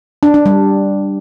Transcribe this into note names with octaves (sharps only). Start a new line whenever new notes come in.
D4
D4
G3